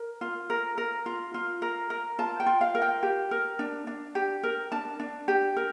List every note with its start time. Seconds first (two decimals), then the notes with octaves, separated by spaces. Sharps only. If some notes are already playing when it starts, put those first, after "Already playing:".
Already playing: A#4
0.21 F4
0.50 A#4
0.78 A#4
1.06 F4
1.34 F4
1.62 A#4
1.90 A#4
2.19 F4 A5
2.40 G5
2.46 F4
2.61 F5
2.75 A#4
2.82 G5
3.03 G4
3.31 A#4
3.59 D4
3.87 D4
4.15 G4
4.43 A#4
4.72 D4 A5
5.00 D4
5.28 G4
5.57 A#4